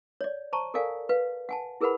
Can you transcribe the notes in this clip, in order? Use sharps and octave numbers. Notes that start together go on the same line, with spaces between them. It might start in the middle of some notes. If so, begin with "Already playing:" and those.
C#5 D5
C5 A5 A#5 C#6
A4 A#4 D5 F5 G#5
B4 F5
F#5 G#5 A5
E4 G#4 A#4 B4 F#5 B5